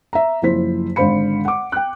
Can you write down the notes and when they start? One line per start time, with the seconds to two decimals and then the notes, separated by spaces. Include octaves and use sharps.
0.13 E5 A#5
0.42 F#1 F3 E4 C5 B6
0.96 G#1 D3 C5 F5 B5 C#7
1.45 F#5 D6
1.72 G5 F#6